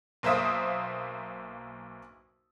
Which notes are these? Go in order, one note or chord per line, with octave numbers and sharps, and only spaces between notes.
B1 A#3 C5 E5 D#6